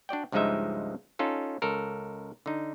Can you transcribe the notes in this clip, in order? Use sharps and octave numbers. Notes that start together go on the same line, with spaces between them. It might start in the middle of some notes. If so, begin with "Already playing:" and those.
D4 F#4 D5 G5
C#2 G2 F3 G#3 D#4 E5
C#4 D#4 F4 A4
C#2 A4 A#4
D3 D#4